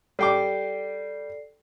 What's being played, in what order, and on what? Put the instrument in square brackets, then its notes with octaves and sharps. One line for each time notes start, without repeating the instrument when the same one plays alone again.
[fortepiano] G3 G5 D6 [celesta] A4 D5 C7